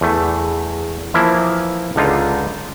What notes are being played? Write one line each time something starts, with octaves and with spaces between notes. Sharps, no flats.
E2 A3
E3 F3 A#3 E4
C#2 D3 D4 D#4 F4